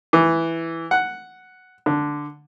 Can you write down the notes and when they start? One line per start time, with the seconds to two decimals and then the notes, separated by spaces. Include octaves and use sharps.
0.13 E3
0.91 F#5
1.86 D3